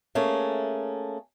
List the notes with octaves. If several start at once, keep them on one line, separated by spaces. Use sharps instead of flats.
A3 A#3 C#4 G#4